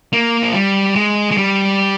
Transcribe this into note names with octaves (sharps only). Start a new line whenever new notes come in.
A#3
F3
G3
G#3
G#3
G3